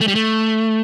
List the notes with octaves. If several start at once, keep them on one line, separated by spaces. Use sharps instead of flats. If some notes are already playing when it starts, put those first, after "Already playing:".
A3
G3
A3